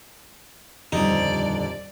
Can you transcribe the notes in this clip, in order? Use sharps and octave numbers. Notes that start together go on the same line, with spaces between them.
D#1 F2 D3 G3 D#4 D5